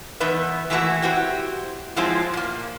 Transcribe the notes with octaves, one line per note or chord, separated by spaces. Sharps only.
E2 B3 D#4 B4 E5
E3 A3 A#3 C4 E4 F#4
C4 E4 F#4 G4
F3 F#3 G#3 C4 E4 F4
A#2 A#3